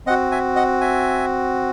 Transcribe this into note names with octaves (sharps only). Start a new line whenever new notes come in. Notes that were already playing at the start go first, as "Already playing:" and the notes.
C4 F#4 D#5 F#5
E5 G#5
D#5 F#5
E5 G#5